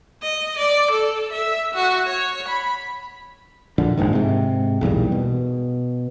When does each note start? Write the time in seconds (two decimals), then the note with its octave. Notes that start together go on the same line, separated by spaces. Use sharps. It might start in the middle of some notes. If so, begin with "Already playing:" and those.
0.23 D#5
0.58 D5
0.91 A4
1.32 E5
1.74 F#4
2.07 C#5
2.48 B5
3.78 A#1 F2 D3
3.97 G1 C2 G#2 D#3
4.13 G#2 C3
4.81 B1 E2 A#2 G3
5.12 B2